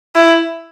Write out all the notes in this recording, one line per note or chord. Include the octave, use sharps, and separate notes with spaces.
E4